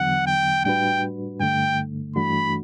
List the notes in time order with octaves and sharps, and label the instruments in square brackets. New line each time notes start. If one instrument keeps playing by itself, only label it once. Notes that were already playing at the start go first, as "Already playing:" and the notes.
Already playing: [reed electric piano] E2 D3 F#3 B3 [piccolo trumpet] F#5
[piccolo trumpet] G5
[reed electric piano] A2 G3 D4 F#4 B4 [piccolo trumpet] G5
[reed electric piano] G2 D3 A3 [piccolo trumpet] G5
[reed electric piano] G2 E3 A3 D4 F#4 [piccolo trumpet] B5